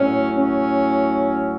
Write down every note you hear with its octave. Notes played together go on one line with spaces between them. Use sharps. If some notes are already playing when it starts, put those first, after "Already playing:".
Already playing: A2 F#3 C#4
C#4